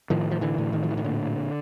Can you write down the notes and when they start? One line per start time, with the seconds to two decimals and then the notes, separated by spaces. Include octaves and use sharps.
0.10 A2 D#3 F3
0.31 F3
0.41 D3 E3
0.58 A2
0.73 D#3
0.83 F3
0.90 E3
0.97 D#3
1.04 A#2 D3